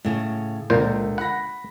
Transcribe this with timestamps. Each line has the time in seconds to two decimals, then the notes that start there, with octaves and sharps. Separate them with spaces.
0.05 A2 C#3
0.70 C#2 A#2 D3 A#4 C5
1.18 F#5 B5 A#6